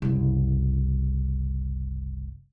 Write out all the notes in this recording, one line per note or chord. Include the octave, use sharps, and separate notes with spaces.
F#1 C2